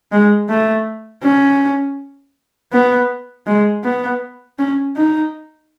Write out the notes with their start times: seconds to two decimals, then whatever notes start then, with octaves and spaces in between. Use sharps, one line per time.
0.12 G#3
0.49 A3
1.23 C#4
2.73 B3
3.47 G#3
3.84 B3
4.59 C#4
4.97 D#4